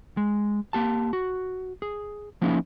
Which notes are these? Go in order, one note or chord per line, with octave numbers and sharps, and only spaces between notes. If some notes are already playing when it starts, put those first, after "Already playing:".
G#3
A#3 G4 A5
F#4
G#4
F3 A#3 C#4 D#4 E4 G#4